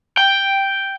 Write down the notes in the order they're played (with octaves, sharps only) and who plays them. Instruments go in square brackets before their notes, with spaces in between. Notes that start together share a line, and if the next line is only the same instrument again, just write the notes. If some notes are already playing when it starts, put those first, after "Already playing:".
[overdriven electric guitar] G5